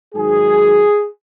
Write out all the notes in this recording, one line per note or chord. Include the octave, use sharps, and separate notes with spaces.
G#2 D#3 F#3 G#4